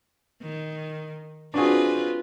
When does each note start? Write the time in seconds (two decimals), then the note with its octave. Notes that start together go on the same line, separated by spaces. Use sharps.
0.42 D#3
1.54 C4 D4 F4 F#4 G#4 B4